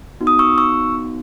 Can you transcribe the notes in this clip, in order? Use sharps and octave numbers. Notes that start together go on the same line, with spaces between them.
B3 D#4 F#4
D#6
C#6 E6
C#6 E6